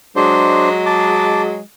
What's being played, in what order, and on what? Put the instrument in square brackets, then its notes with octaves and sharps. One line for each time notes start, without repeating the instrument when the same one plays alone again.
[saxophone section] F#3 G#3 [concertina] D4 C5
[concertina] A5 D6